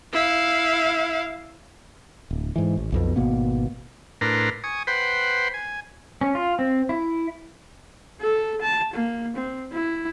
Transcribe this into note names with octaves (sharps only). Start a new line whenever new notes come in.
E4 F5
D1
G#2 E3
A1
B1 F2 B2
G#1 B2 A#3 B3
A2 D4 A#4 B4 A#5 C6
G#5 C#6 D#6
B4 C5 F#5 G5 B5 C6
G#5
C#4
F4
C4
E4
A4
A5
A#3
C4
E4